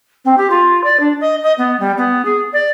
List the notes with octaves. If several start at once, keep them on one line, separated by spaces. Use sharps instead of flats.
C4
G4
F4
D5
D4
D#5
D#5
B3
G3
B3
G#4
D5